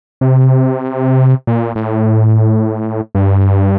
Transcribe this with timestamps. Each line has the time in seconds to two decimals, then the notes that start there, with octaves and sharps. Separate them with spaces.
0.21 C3
1.47 A#2
1.75 A2
3.15 G2